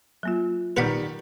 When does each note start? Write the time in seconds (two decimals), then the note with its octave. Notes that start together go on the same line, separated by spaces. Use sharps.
0.23 F#3 A#3 F4
0.77 D#3 G3 B4 F#5 B5